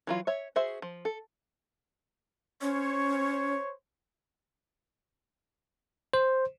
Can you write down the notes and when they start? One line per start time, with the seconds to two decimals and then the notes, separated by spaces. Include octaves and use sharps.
0.07 E3 F#3 F4
0.27 C#5 E5
0.56 F#4 G#4 C5 E5
0.82 F3
1.05 A4
2.62 C#4 C5 C#5
6.14 C5